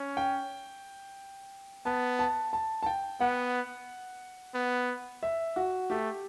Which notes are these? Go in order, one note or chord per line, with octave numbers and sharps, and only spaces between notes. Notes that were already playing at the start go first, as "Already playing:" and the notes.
Already playing: C#4
G5
B3 A5
A5
A5
A5
G5
B3 F#5
B3
E5
F#4
A3 G4